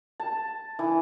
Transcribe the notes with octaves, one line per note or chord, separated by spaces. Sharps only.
A5
E3